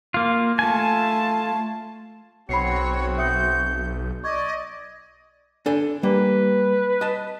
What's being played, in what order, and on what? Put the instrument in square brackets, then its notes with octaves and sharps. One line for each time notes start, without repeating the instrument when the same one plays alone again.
[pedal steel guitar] A#3 F4
[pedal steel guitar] A3 G#5 [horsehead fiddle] F4 A5
[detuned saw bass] B1 [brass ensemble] C4 F#4 [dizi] C#5 [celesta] B5 C7 C#7
[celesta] E5 D#6 C#7 [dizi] G6
[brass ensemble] D5 [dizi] D#5 [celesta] C#6 G#6
[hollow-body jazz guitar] D4 A4 G#5
[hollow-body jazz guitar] G3 A#3 [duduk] B4
[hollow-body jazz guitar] D#5 A5